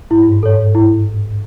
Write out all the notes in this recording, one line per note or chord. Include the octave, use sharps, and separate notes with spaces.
G#2 E4
G2
G#2
A4 C#5
G#2
A2 E4